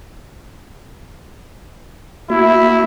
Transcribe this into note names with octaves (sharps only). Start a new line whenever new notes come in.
A#3 E4 F#4 E5